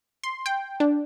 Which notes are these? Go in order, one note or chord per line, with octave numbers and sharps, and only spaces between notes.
C6
G5
D4